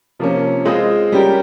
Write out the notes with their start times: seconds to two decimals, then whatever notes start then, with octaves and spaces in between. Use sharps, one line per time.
0.19 C3 F3 A#3 C#4
0.65 G#3 C4 F4 C5 D#5
1.12 G3 C#4 G4 A#4